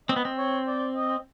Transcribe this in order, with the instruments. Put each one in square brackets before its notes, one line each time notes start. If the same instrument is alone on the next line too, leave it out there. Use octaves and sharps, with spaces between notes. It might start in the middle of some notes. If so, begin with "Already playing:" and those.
[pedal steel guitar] C4 [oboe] D#5
[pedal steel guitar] B3
C4
[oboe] C#5
D5
D#5